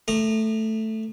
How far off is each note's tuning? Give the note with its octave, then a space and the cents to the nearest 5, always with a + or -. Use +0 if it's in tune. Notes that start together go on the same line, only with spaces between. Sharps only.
A3 +0 A#5 +0 D#6 -40